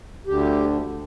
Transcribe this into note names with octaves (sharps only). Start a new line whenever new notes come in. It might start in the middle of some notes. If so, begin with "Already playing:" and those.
D2 D3 G4